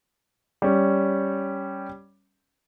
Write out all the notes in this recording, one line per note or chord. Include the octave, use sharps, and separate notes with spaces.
G3 C#4